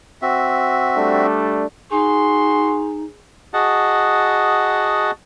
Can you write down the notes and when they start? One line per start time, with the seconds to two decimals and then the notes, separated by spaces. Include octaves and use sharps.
0.22 C4 F#4 E5
0.96 G3 A3 D4
1.91 D#4 F#4 G#4 C6
3.54 F#4 G#4 D#5 F#5 A5